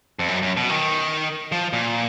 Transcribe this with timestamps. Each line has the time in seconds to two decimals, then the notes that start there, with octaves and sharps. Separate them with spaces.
0.19 F2
0.29 F#2
0.42 F#2
0.57 B2
0.70 D#3
1.52 F3
1.73 A#2